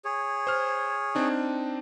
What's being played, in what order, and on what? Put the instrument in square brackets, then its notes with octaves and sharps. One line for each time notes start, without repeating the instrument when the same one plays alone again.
[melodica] G#4 C#5
[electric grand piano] C5 F6
C4 D4 D#4